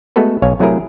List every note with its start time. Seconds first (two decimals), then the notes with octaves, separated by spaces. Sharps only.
0.16 G#3 A3 B3 F#4 A4 B4
0.42 B1 C#5 F5 G#5
0.60 C3 F#3 A3 E4 G#4 A#4